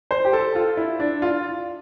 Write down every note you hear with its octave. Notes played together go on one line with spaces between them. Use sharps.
C5
G4
A4
F4
E4
D4
F4